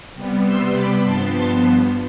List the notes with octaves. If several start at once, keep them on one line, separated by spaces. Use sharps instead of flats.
C3 G3 B3
C6 E6
B5 D6
G2 F3 B3 A5 C6
A5 C6